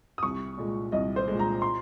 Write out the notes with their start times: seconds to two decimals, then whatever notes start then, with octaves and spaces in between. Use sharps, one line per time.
0.18 D#6
0.23 C2 C#6
0.57 A#2 G#3
0.92 C2 D#5
1.16 C5
1.28 A#2 G#3
1.39 A#5
1.62 C6